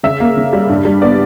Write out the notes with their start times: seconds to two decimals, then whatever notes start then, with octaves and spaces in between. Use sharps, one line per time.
0.03 C#3 E5
0.20 A#3
0.37 C#3
0.53 G3
0.69 G2
0.85 G3
1.02 B3 D5